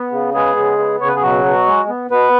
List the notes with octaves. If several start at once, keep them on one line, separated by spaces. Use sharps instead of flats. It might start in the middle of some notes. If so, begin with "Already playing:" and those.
Already playing: B3
C#3
G#3 B3 G#4
C#3
B3
C#3 C#5
B4
G#4
B2 F#3 F#4
B2
G#3
B3
B2 B3 B4